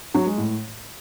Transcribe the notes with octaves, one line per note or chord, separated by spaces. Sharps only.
F#3
G#3
A2